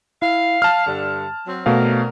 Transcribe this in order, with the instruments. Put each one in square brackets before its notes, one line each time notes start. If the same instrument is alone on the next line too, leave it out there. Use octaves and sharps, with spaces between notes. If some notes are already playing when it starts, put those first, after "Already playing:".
[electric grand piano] E4 [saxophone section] F5
[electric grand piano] A5 F6
[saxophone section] G2 D3
F#3 C4
[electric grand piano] B2 A3 F5 [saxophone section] C4 D4 A#4